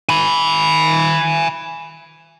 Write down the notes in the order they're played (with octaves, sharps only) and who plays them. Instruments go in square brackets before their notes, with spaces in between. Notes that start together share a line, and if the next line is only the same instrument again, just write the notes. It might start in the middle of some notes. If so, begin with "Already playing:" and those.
[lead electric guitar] G#5 B5